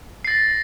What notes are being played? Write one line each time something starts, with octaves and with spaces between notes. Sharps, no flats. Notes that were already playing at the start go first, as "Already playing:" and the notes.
A6 A#6 C7